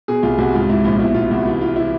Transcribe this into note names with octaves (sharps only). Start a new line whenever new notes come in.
B2 G#4
C2 F4
C2 F#4
G#2 F4
G#2 E4
A#1 F4
B2 E4
B2 F4
C2 F#4
E3 F4
E3 F4
E3 E4